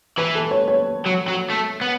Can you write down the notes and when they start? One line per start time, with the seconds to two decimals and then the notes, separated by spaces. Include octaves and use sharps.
0.18 E3 B4
0.35 A4
0.51 C#5
0.68 C#5
1.06 F#3
1.28 F#3
1.50 A3
1.81 B3